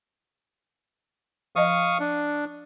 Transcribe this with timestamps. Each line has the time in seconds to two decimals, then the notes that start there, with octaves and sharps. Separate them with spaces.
1.56 F3 D#5 F5 C#6 D#6
2.00 D4